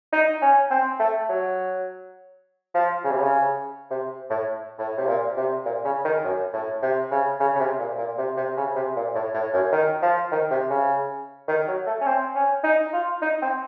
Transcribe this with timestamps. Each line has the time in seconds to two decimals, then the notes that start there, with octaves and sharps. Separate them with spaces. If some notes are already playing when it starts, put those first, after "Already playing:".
0.13 D#4
0.42 C#4
0.71 C4
1.00 A3
1.29 F#3
2.75 F3
3.04 C#3
3.11 C3
3.20 C#3
3.91 C3
4.30 A2
4.79 A2
4.98 C3
5.07 A#2
5.37 C3
5.66 A#2
5.85 C#3
6.05 D#3
6.24 F#2
6.53 A2
6.83 C3
7.11 C#3
7.40 C#3
7.56 C#3
7.60 C3
7.79 A#2
7.98 A#2
8.18 C3
8.37 C3
8.57 C#3
8.76 C3
8.96 A#2
9.15 A2
9.34 A2
9.54 F#2
9.73 D#3
10.02 F3
10.32 D#3
10.51 C3
10.70 C#3
11.48 D#3
11.68 F#3
11.87 A3
12.01 C#4
12.07 C4
12.35 C#4
12.64 D#4
12.93 F4
13.22 D#4
13.42 C4